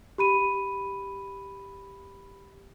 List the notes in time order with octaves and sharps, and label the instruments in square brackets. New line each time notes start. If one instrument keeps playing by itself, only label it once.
[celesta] G4 B5 D#7